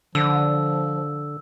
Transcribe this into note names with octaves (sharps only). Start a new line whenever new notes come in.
D3 F3 E6